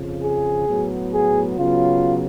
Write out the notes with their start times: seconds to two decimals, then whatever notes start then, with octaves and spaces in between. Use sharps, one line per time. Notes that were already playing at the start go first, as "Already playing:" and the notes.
Already playing: F2 C#3 F3
0.23 G#4
0.68 A2 F#3 B3
1.13 G#4
1.58 C#3 F#3 B3 F4